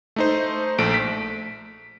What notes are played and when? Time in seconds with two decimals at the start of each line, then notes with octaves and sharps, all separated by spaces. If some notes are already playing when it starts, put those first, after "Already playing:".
0.16 A3 D#4 C5
0.78 A#1 A3 D7
0.94 B6